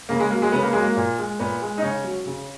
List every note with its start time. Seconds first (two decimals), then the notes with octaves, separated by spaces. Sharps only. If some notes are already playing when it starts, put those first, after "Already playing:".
0.09 C#3 A#3
0.20 G#3
0.31 F#3 A#3
0.42 G#3
0.52 C#3 B3
0.63 A#3
0.73 F#3 G#3
0.82 A#3
0.97 A#2
1.18 G#3
1.40 A#2 B3
1.62 G#3
1.78 D#4
1.83 C#3 C#4
2.04 F#3
2.26 C#3